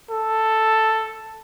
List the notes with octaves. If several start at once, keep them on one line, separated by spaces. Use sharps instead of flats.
A4